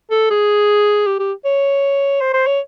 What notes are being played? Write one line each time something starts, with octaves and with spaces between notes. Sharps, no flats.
A4
G#4
G4
G4
C#5
C5
C5
C#5